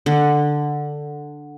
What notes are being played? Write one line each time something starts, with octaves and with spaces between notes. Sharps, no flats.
D3